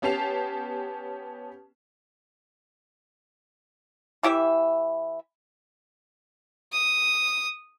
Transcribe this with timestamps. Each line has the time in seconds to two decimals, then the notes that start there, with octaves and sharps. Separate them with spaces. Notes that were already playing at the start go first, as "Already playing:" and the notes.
0.02 B3 C#4 G4 A5 C7 F7
4.23 E3 E4 G4 E5
6.72 D#6